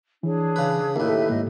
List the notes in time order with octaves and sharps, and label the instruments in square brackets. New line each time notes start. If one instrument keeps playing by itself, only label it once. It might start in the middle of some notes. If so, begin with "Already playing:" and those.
[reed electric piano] E3 [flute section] D4 G#4 C#5
[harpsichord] C#3 B4
[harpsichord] D#2 A2 [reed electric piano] A#4 [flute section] B4 E5
[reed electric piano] G4 A4
[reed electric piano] G#2 A#3 [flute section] D#5